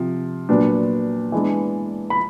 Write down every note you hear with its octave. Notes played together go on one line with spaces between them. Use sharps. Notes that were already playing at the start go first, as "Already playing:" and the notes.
Already playing: C3 F3
A#2 F#3 B3 D4
E3 G#3 B3 D4
B5